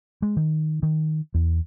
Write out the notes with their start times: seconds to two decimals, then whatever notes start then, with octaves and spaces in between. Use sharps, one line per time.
0.22 G#3
0.37 D#3
0.83 D#3
1.34 E2